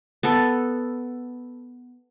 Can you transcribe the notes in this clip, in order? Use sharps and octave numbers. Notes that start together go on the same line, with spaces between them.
B3 A4